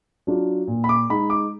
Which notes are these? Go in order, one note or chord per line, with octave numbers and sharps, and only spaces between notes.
F#3 D4 F4
A#2
B5
D6
G#3 D#4 B5
D6